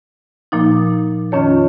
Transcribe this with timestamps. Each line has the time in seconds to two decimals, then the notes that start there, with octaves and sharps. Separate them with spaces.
0.52 A#2 F3 A#3 D#4
1.32 F2 D#3 C#4 F4 C#5